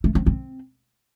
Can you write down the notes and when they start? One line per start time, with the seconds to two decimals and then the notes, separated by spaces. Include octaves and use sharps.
0.04 A3
0.15 C4
0.26 C4